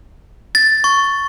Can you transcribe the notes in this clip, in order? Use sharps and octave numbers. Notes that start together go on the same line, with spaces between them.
A6
C#6